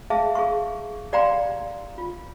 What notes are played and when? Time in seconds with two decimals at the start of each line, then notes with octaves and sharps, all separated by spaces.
0.10 G#4 E5 F5 A5
0.35 G#4 F5 C#6
1.13 G4 D5 F5 G5 A#5 C6
1.98 F4